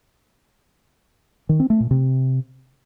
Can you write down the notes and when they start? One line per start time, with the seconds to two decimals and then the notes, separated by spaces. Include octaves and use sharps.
1.49 D#3
1.60 C4
1.70 A3
1.80 A#2
1.91 C3